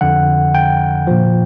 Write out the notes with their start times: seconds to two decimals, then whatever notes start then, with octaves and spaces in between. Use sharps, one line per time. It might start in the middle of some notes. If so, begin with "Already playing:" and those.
0.01 F2 D3 F3 F#5
0.55 G5
1.07 A#2 F3